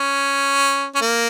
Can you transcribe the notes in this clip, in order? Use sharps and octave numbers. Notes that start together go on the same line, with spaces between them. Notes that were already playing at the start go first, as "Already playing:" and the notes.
Already playing: C#4
C#4
A#3